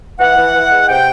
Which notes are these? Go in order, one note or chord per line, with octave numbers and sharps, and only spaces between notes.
E3 F#5
E3
E3
G#3
C3 G5